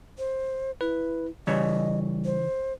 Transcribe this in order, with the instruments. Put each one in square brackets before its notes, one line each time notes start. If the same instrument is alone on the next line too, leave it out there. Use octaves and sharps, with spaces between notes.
[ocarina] C5
[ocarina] E4 [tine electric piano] B4
[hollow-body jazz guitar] C#3 E3 C#5 [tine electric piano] G3 [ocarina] D#5
[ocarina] C5